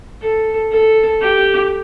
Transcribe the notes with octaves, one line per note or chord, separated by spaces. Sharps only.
A4
A4
G4